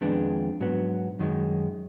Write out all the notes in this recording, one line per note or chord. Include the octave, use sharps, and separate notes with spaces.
F2 D#3 G#3 B3 D4
G#2 F#3 B3
F#2 D#3 G#3